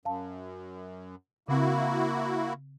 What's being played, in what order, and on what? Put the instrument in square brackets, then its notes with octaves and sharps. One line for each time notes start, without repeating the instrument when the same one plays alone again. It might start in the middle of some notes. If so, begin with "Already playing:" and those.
[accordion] F#2 [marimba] F5 A5
[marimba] C#3 C4 [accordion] A#3 E4 F#4